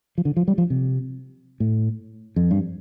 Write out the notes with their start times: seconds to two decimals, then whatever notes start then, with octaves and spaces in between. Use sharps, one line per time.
0.18 F3
0.25 D3
0.37 F3
0.48 G3
0.58 F3
0.70 C3
1.60 A2
2.36 F2
2.51 G2